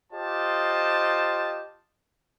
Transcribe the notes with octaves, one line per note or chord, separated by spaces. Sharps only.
F4 G4 C5 D#5 A5